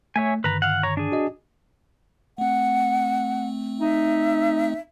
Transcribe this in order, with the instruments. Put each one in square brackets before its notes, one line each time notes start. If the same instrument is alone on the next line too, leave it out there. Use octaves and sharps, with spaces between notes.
[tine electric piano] A3 [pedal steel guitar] C#5 E5 G#5
[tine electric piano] G2 D3 D#3 [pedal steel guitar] B4 A#5
[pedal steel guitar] F5 F#5
C#5 A#5
D4 G#4
[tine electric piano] F#4 D#5
[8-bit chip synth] A3 C4 [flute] F#5
[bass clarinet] D#4 [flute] E5